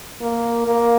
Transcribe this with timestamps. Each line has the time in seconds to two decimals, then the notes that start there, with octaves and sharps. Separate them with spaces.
0.21 A#3
0.67 A#3